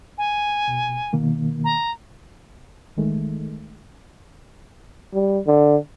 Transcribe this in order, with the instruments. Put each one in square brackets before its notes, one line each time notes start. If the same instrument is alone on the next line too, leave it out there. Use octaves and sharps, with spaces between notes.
[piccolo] G#5
[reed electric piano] B2
B2 D#3 A#3
[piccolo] A#5
[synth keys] A1 D#3 G#3 A3
[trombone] G3
D3